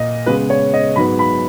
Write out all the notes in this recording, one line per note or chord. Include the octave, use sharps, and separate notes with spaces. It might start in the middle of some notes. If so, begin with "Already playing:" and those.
Already playing: A#2 A#3 D#5
C#3 G#3 B3 B4
C#5
D#5
G#2 F#3 B3 B5
B5